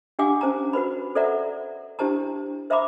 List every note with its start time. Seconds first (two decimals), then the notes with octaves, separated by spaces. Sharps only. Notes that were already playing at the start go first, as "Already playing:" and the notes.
0.19 D4 G4 F5 F#5 G#5 D6
0.41 C#4 C5 A5 A#5
0.73 F#4 B4 C5 B5
1.15 A4 C5 D5 E5 F#5 A#5
1.99 D4 E4 G4 C5 A5 A#5
2.70 C5 E5 F5 A#5 B5 D6